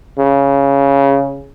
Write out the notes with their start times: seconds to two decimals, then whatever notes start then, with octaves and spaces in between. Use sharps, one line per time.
0.18 C#3